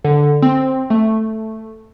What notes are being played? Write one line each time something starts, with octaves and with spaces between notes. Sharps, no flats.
D3
C4
A3